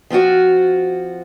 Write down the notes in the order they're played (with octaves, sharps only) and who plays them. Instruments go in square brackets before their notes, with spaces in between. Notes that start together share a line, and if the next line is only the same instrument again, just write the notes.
[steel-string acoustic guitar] F3 C4 F4 F#4